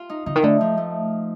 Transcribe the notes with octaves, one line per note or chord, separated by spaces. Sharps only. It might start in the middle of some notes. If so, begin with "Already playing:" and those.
Already playing: F4
D#4
D3 D#4
D#3
D3 A3
F3
A3